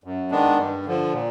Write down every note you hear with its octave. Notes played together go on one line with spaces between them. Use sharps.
F#2
D#3 G#3 B3 D4
G2
D3 F3
A#2